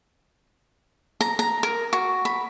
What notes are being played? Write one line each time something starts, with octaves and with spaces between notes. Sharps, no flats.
A#5
A#5
A#4
F#4
B5